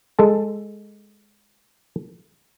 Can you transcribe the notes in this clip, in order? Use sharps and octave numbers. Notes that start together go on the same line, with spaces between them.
G#3 A4 A5